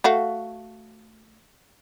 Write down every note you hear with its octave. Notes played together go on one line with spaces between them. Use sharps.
A3 F#4 F5